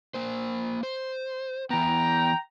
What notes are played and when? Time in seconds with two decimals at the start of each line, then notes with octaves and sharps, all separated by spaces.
0.14 A#3 C5
0.83 C5
1.70 E3 B3 G5 A#5